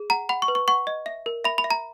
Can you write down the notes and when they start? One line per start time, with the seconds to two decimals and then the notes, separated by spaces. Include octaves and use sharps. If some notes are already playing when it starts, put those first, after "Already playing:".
Already playing: G#4
0.10 F#5 A#5
0.29 F#5 B5
0.42 C#6
0.48 B4
0.55 C#6
0.68 F#5 C#6
0.87 D#5
1.06 E5
1.26 A#4
1.44 E5 B5
1.58 B5
1.64 E5
1.71 A#5